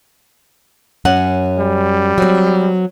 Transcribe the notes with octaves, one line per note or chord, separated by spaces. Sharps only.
F#2 C#4 F#5
G3
F#3 C4